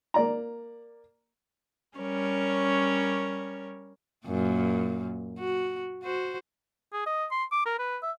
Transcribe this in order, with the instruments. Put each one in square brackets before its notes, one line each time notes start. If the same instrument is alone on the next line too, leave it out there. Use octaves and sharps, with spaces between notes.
[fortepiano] A#3 D5 A#5
[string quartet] G3 C#4 A#4 C#5
[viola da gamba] F#2 A#2 A#3
F#4
F#4 C5
[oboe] G#4
D#5
C6
D6
A#4
B4
E5